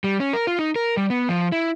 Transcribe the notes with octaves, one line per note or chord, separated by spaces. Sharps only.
G3
C#4
A#4
F4
D#4
A#4
G3
B3
F3
E4